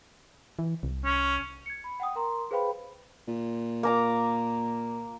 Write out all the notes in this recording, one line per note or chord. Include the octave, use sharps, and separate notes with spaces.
E3
C2
C#4
G#6 C#7
B5
F#5 G5 D#6
A#4 A#5 C6
G#4 B4 C5 F5 G5 B5
A#2
A#3 A#5 D6